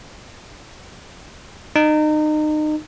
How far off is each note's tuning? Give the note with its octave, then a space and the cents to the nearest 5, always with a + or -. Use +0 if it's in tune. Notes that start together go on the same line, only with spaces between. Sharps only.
D#4 -30